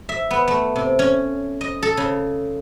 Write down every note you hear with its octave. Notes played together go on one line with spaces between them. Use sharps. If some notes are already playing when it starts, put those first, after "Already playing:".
E5
B3
A3
C3
C#4
D#5
A4
C#3